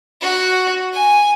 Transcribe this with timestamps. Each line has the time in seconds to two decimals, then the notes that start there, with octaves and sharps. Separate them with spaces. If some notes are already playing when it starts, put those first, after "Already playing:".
0.21 F#4
0.93 G#5